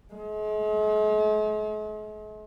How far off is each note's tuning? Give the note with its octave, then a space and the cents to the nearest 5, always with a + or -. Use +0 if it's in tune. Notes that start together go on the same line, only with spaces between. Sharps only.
G#3 +45